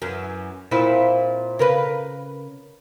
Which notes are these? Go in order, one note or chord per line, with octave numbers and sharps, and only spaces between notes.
F#2 E3
A#2 C4 E4
C#3 A#4 B4